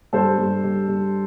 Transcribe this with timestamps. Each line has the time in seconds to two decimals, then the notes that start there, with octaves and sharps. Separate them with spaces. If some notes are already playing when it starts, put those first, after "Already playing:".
0.13 G2 A4 C5
0.38 G2
0.64 G2
0.88 G2